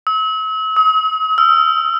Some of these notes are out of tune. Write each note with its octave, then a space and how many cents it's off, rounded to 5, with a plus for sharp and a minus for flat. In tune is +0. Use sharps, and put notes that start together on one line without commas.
E6 -40
D#6 +45
E6 +45